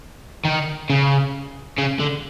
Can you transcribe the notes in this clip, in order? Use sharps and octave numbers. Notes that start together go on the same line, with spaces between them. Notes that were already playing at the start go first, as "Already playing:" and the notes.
D#3
C#3
C#3
D3